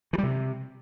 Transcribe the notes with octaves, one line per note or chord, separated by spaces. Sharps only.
E3
G3
C3